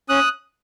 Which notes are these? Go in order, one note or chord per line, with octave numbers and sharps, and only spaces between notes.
C#4 D#6 F#6